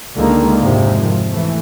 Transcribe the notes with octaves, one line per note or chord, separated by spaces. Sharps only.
C#2 D3 D#3 G#3 A#3
G#1 F2 G#2 C3 F3
E3 A3